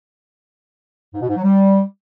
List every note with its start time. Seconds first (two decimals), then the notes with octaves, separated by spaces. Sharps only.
1.14 G#2
1.21 B2
1.29 G#2
1.36 F#3
1.43 G3